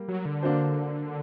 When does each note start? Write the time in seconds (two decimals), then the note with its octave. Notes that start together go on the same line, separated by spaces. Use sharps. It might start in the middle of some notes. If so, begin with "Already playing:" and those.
Already playing: G3 A#3
0.08 F#3
0.25 D3
0.43 A#3 D4 F#4 C5